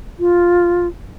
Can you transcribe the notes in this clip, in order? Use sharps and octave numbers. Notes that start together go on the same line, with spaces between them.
F4